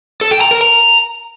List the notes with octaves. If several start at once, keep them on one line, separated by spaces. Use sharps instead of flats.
A4
G5
A#5
A#4
A#5